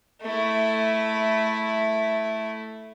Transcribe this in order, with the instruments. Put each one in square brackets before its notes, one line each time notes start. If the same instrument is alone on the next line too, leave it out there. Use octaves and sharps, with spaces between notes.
[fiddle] A3 E4